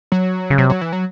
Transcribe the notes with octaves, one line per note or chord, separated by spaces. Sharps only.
F#3
C#3
C3 F#3
F#3
E3
F#3